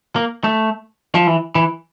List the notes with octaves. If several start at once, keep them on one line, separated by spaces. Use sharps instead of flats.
A#3
A3
F3
E3
E3